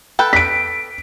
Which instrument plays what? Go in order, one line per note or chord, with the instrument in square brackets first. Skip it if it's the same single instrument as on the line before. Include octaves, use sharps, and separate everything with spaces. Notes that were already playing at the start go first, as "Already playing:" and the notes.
[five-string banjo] A4 B4 G5
[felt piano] B6 D7